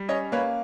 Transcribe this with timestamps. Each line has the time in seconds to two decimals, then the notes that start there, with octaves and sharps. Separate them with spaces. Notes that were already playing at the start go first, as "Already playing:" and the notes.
Already playing: G3
0.08 C#4 C#5 D#5
0.32 A#3 B4 C#5